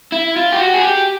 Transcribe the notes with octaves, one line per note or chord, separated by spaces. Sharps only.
E4
F4
G4
F#4
G#4
G4